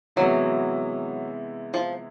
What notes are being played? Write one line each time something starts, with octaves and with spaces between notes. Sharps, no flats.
C3 E3 F#3 G#3 B3 E4
F3